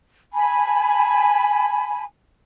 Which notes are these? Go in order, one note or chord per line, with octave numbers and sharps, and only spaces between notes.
G#5 A5 B5